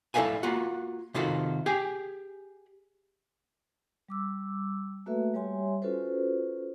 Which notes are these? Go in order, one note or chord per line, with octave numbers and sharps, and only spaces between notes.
E4 A4 C5 D5 F5 G#5
A#3 F4 F#4
C3 D#3 F4 F#4 A4
G4 G#4 G#5
G3 D6 E6
A3 A#3 F#4 A4 B4 E5
G3 G4 C#5 E5 G#5 C6
C#4 F4 F#4 A4 B4 C5